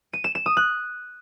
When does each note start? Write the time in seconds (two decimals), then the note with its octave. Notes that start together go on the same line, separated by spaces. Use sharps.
0.13 D#7
0.24 E7
0.35 E7
0.46 D#6
0.57 F#6